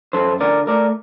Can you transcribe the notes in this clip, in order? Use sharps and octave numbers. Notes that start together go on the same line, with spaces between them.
F#2 A4 C5
D3 A#4 D5
A3 A#4 D5